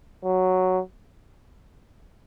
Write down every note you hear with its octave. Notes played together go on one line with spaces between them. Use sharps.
F#3